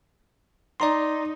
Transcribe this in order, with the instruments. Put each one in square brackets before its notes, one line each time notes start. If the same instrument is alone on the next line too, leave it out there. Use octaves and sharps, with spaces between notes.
[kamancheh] D#4 [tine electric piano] D5 A#5 C6